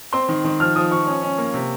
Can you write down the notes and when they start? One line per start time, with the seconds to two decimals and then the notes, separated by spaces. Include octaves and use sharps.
0.13 C4 C6
0.28 D#3
0.45 D#3
0.60 F3 F6
0.76 F3 D#6
0.91 F3 C#6
1.07 C#4
1.23 C#4
1.38 A#3
1.54 C3